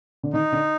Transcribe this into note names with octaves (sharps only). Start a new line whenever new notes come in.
D3
D#3 D#4
D3